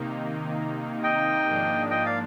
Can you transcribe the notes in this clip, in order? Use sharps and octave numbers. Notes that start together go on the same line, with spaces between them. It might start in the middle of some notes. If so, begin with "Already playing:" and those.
Already playing: C3 D#3 A#3 D#4
D#5 G5
G#2 F3 A#3 D4
D#5 G5
D5 F5